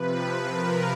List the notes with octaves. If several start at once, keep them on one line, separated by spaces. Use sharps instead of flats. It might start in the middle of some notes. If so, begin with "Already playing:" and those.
Already playing: C3 F3 B4
A#4